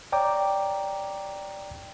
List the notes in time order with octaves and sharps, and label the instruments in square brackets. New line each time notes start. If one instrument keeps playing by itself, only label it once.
[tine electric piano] C#5 D5 G5 A#5 D6